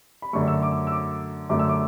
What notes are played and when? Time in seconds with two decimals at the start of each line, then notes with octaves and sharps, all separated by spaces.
0.22 B5
0.33 F#2 D3 F#3 A3 C#6
0.48 E6
0.63 D6
0.87 E6
0.92 D6
1.49 F#2 D3 F#3 A3 D6
1.59 E6
1.69 D6